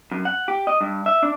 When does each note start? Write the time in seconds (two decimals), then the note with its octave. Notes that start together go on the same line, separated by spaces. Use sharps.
0.12 F#2
0.25 F#5
0.48 G4
0.67 D#5
0.81 G2
1.06 E5
1.23 D4